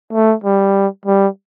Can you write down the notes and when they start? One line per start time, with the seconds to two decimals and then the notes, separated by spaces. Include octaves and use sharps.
0.13 A3
0.44 G3
1.06 G3